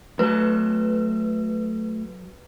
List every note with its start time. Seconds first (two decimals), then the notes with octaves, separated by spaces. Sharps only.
0.19 F#3 A3 A4 B4